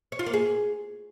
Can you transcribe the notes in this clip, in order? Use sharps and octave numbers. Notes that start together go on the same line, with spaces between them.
C#5
F4
A#3
G#4